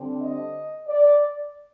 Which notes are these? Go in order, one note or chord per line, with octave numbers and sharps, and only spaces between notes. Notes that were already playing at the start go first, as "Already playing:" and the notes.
Already playing: D3 G3 C4
D#5
D5